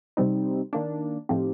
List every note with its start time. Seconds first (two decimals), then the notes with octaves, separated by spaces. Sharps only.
0.17 C3 G3 C4 D#4
0.73 D#3 A#3 D4
1.29 A2 F3 C4 D#4 G4